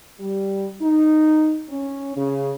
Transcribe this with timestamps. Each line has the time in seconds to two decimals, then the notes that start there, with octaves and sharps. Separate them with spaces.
0.20 G3
0.82 D#4
1.69 C#4
2.16 C#3